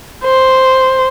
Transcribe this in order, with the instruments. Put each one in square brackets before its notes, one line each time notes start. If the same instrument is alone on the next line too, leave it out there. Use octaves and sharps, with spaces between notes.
[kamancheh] C5